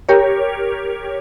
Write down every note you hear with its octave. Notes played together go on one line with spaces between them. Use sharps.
G4 A#4 C#5